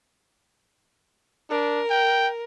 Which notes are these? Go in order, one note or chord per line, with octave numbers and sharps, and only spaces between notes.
D4 A#4
G5